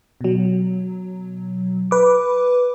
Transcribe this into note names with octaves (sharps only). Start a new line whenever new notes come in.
B2 F#3
B4 D6